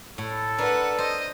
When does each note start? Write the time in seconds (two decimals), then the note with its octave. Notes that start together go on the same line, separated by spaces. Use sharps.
0.18 A2 A4
0.58 D4 A#4 B4 F#5
0.98 C5 D#5